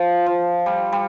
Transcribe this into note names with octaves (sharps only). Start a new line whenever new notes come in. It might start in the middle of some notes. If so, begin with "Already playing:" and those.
Already playing: F3
F3
G3
G3